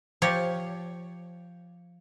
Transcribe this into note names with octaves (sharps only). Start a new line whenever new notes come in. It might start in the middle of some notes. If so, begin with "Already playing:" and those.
F3 G4 C#5